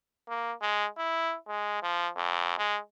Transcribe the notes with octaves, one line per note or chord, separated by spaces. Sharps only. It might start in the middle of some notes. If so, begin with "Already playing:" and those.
A#3
G#3
E4
G#3
F3
F2
G#3